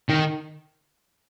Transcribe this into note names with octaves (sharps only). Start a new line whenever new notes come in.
D#3